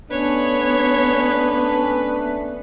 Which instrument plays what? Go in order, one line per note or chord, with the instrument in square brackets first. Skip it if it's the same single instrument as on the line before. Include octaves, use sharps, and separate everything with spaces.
[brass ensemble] A3 C#4 D4 [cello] B3 [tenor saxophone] B4 [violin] C#5